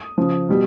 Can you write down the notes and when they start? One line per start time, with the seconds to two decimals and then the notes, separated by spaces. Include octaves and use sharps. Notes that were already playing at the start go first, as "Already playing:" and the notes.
Already playing: D#6
0.18 C#3 F3
0.49 B2 G3